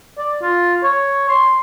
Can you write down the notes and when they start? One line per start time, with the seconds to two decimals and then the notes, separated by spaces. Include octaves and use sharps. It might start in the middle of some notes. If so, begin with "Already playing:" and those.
0.18 D5
0.42 F4
0.83 C#5
1.29 C6